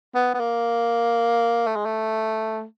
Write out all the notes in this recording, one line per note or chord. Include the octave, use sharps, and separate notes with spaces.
B3
B3
A#3
A3
G#3
A3